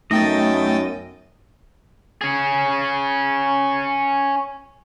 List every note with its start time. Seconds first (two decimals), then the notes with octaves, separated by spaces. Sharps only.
0.11 F#2 A3 B3 D#4 D#5 G5 A6
2.21 C#4 G#4